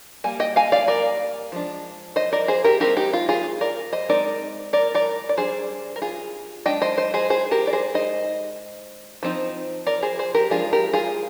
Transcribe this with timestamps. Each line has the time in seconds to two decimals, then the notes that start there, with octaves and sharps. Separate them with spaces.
0.24 G3 A#3 G#5
0.40 D#5 G5
0.56 F5 G#5
0.72 D5 F5
0.88 A#4 D5
1.52 F3 G#3 D4
2.16 C5 D#5
2.33 A#4 D5
2.48 G#4 C5
2.64 G4 A#4
2.80 G#3 C4 D#4 G4 A#4
2.97 D#4 G4
3.13 F4
3.29 F4 G#4
3.61 A#4 D5
3.93 C5 D#5
4.09 G#3 C4 D#4 A#4 D5
4.73 A#4 D5
4.95 A#4 D5
5.29 D5
5.37 G3 D4 G#4 C5
5.96 A#4
6.02 F4 G#4
6.66 G#3 D4 D#5 G5
6.82 C5 D#5
6.98 C5 D#5
7.14 G#4 C5
7.30 G#4 C5
7.51 G4 A#4
7.67 D5
7.73 G#4 C5
7.94 G#3 D#4 C5 D#5
9.23 F3 C4 D#4
9.87 A#4 D5
10.03 G#4 C5
10.19 G#4 C5
10.35 G4 A#4
10.50 F3 G#3 D4 F4 G#4
10.73 G4 A#4
10.93 F4 G#4